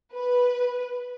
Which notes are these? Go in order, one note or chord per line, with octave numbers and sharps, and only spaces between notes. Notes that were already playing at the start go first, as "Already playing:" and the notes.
B4